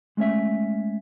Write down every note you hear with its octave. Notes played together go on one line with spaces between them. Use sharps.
G#3 A3 C#4 C#5 E5